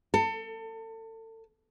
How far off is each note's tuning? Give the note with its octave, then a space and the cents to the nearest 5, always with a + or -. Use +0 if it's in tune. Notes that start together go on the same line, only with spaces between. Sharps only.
A4 +30